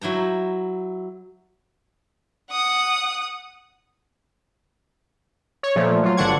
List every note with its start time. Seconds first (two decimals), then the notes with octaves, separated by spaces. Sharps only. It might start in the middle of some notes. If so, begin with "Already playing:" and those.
0.01 F#3 E4 G5 A#5
2.51 F#5 D#6
5.63 C#5
5.76 A#2 F3 A3
6.03 F#3 F4
6.17 G1 D3 D4 F#5 C#6 G#6